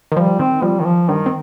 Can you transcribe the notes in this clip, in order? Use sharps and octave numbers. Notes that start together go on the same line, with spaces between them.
D#3
F3 G3
D#3 C4
F3 G3
D#3
F3
G2 D#3 G3
C4